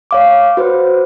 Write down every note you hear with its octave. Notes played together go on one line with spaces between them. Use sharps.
C#5 F5 D6
F#4 B4 C5